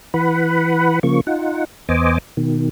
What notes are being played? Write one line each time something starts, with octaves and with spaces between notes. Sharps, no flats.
E3 B4 F#5 B5
C#3 F3 A#3 C#6
D#4 F4 F#5
E2 B3 C5 D#5 G#5 D6
B2 D#3